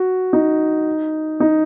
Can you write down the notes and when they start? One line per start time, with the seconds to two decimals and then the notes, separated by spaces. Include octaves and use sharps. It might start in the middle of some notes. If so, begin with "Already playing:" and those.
Already playing: F#4
0.33 D#4
1.40 D#4